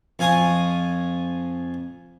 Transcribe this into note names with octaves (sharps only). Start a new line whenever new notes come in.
F2 F5 G#5 C#6 D#6